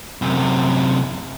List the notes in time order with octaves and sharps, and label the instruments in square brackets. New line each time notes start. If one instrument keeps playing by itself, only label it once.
[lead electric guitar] F#2 C3